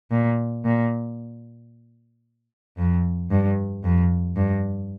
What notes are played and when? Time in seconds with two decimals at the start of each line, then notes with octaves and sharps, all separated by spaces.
0.11 A#2
0.65 A#2
2.78 F2
3.31 G2
3.84 F2
4.37 G2